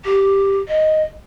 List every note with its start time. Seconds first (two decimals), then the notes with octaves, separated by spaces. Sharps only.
0.05 G4
0.68 D#5